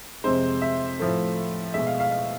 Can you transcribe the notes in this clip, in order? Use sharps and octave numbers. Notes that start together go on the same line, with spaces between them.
F2 C3 G#3 C5
E5
A2 F3 A3
B2 G#3 E5
F5
F5
F5